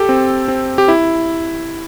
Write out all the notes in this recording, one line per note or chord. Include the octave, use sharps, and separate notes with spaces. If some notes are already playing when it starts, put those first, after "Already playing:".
Already playing: G4 A4
C4
C4
G4
E4